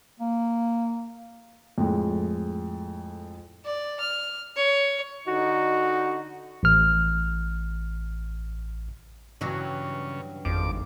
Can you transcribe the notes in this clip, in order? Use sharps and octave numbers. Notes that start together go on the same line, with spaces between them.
A#3
F2 A2 G#3
D5
F6
C#5
D3 D#4 F#4
A1 F6
G2 C#3 E3 F#3
G#1 F2 D6